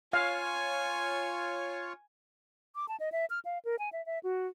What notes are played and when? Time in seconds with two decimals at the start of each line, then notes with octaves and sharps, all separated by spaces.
0.13 F4 C#5 F5 G#5
2.75 D6
2.88 A5
3.00 D#5
3.12 E5
3.30 F6
3.45 F5
3.65 A#4
3.79 G#5
3.92 E5
4.06 E5
4.23 F#4